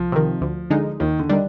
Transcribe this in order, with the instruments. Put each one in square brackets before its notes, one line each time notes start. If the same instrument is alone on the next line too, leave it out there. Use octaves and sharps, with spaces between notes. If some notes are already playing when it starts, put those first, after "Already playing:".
Already playing: [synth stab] C2 [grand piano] F3
[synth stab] C3 D#3
D2
D3 G#3 D#4
[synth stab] D#2 [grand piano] D#3
[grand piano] D3
[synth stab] D#3 G3 D4